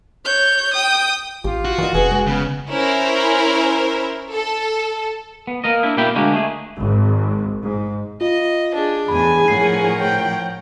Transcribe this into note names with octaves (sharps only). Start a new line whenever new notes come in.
C#5 G6
G5 D#6
A1 F4 G4
F#4
D#3 E3 D5 D#5
F1 C#4 G#4 B4
G#3
C#3 B3
C#4 E4 A#4 C5
A4
B3
A#3 A#4 D#5
D4 E4
B2 G3 A#3 E4 G5 B5
D2 G#3 A#3 D4 F#4 G4
A3 G#4
G#1
G#2
F4 D#5
D4 G#4
E2 A2 G#4 G#5 B5
A2 F3 A#4 C#5 F#5 C7
G5